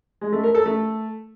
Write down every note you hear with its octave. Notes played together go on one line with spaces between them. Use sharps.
G#3
A3
A#4
A4
A3